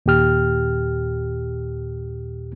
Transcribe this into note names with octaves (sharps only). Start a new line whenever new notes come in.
D#2 A#2 G4 F6